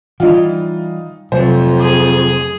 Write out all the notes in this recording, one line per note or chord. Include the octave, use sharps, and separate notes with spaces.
E3 G3 D#4 F4
F2 C3 F#3 A3 C5
G#4